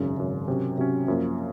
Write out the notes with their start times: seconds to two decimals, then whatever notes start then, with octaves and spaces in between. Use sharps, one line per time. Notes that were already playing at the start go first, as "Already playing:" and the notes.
Already playing: G#1 F#2 C#3
0.17 G#1 F#2 C#3
0.48 C3 F#3 C#4
0.78 C3 F#3 C#4
1.08 F#2 F3 A#3